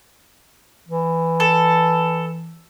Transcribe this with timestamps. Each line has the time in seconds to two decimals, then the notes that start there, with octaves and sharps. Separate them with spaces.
0.89 E3
1.40 A4